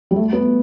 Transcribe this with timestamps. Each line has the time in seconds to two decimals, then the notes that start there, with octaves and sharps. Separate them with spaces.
0.11 G3
0.16 A3
0.33 B3